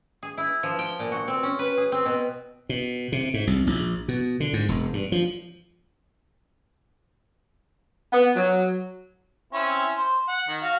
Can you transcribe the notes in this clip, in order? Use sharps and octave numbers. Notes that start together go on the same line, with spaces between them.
G#4
E4
F3
G5
A#2
F#4
C4
C#4
B4
G#4
C4
B2
B2
C3
G#2
C2
A#1
B2
D3
G#2
E1
G2
F3
B3
F#3
C4 C#4 E4
C5
F#5
D#3
F#4 F5